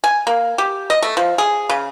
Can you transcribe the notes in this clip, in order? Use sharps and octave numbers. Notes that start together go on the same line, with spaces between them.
G#5
A#3
G4
D#5
A3
F3
G#4
C#3